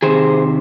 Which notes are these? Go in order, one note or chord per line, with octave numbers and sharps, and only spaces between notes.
C3 D#3 G#4 C5